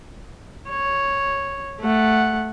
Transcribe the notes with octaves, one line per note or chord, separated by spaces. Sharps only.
C#5
A3 F#5